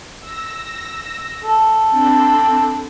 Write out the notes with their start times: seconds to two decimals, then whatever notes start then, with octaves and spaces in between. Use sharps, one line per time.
0.21 E6 A#6
1.44 A4
1.90 C4 D4 B5